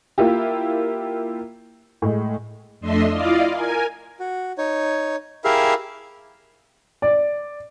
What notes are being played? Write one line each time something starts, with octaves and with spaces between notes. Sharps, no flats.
A#3 E4 F4 G4
A2 G#3
F2 A3 D4 D#5 E5 C6
E4 F4 D5 D#5 F5
A#4 G#5
F#4
D#4 C#5
E4 G4 G#4 A#4 E5 F5
D5